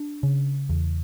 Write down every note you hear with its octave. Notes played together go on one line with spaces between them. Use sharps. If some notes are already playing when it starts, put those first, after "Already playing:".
Already playing: D4
C#3
E2